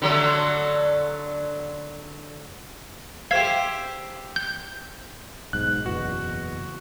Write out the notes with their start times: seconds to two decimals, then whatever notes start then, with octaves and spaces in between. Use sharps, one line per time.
0.02 D3 F#3 A3
3.31 G4 C5 E5 F5 G#6
4.36 G6
5.53 B1 G#2 F#6
5.86 F#1 E2 B2 F#4